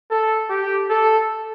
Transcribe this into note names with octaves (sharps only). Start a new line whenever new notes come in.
A4
G4
A4